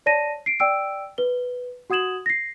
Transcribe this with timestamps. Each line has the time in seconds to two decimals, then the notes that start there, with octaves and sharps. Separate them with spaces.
0.06 C#5 D5 A5 A#6 D#7
0.46 C7 D7
0.60 D5 G5 E6 D7
1.18 B4 G7
1.90 F#4 F#5 D#6 G#6 E7 F#7
2.26 A#6 C7